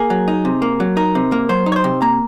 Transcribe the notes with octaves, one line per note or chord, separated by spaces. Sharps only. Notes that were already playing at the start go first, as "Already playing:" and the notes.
Already playing: A#3 G#4
F#3
D#4
C3
A#3
F#3
D#4 A#4
C3
A#3
F#3 C5
D#4
C#5
C5
C3
A#3 A#5